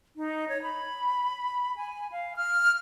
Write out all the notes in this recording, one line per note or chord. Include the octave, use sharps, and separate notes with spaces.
D#4
C#5
B5
G#5
F5
F6